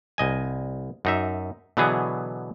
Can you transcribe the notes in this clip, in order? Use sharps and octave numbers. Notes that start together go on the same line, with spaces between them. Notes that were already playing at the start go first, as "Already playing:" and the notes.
C2 D#5 G#5
F#2 D#4 E5
B2 D3 E3 F#3 B3 G#4